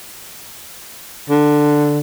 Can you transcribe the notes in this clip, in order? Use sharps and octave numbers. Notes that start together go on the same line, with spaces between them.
D3